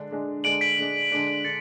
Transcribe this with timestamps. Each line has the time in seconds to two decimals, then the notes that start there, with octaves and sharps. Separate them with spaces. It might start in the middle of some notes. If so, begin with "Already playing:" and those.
Already playing: D3 G#3 D4
0.11 D3 G#3 D4
0.44 D3 G#3 D4 D7 F#7
0.61 B6 D7
0.78 D3 G#3 D4
1.11 D3 G#3 D4
1.45 D3 A6 C#7